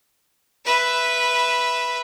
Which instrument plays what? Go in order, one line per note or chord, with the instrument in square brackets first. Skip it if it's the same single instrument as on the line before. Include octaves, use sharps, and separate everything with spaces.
[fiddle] B4 E5